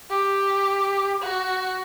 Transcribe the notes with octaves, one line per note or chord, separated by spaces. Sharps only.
G4
F#4